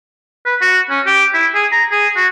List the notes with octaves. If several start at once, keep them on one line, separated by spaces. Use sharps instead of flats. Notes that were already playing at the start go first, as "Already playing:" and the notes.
B4
F#4
C#4
G4
E4
G#4
A#5
G#4
F#4